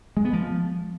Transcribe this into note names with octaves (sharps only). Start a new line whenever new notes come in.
G#3
B3
F3